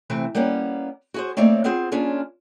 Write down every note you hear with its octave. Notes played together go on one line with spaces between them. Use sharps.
C3 E3 A3 C4
G3 A#3 B3 C#4
F#4 G#4 C5
A3 A#3 C4 D#4 C#5 D5
B3 C4 F4 G#4 C5
A#3 C#4 D4 F4 G#4